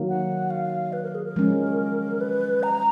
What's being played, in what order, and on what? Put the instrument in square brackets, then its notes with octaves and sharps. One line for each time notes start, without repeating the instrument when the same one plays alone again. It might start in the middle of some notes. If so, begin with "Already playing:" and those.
Already playing: [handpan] D#3 F#3 A#3
[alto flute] F#5
F5
B4
A#4
G#4
A#4
[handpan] F3 G#3 C#4
[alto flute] B4
A#5